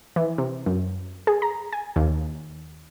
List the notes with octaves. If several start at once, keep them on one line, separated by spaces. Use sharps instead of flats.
E3
C3
F#2
G#4
A#5
G#5
D#2